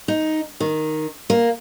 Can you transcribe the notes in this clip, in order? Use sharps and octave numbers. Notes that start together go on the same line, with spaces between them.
D#4
D#3
A#3